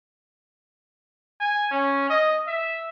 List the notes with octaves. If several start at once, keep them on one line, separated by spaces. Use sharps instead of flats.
G#5
C#4
D#5
E5